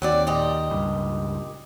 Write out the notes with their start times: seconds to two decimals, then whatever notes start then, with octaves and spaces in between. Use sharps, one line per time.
0.02 D#2 F#3 C4 D5
0.27 A#2 G4 D#5
0.70 C#2 G2